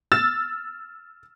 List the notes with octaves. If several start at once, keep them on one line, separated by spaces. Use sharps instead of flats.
E6 F6 A6 E7